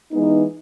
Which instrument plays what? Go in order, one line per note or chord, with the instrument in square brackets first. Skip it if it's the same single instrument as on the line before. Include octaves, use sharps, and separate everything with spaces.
[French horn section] E3 G#3 B3 D#4